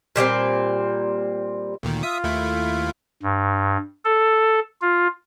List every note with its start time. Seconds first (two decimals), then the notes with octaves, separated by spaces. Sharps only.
0.16 A#2 G3 A3 C4
1.83 D2 A#2 D#3
2.03 F4 E5 D#6
2.24 D#2 A3 E4
3.23 G2
4.05 A4
4.81 F4